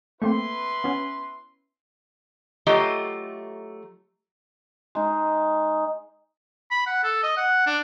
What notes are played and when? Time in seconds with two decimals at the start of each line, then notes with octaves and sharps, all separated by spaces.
0.22 A3 A#3 C4 E4 B4 C6
0.84 B3 C#4
2.67 F#3 A3 F4 G4 D#5
4.95 G#3 D#4
6.71 B5
6.86 F#5
7.04 A4
7.23 D#5
7.37 F#5
7.67 D4